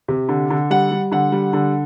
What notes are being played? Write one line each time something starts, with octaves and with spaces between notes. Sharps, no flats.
C3
D3
D3
G3 F#5
G3
D3 F#5
G3
D3